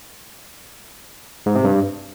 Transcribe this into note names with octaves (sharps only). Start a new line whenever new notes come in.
G#2
C3
G2